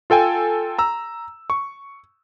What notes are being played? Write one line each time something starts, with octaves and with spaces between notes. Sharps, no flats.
F4 A4 G5 G#5
A#5 E6
C#6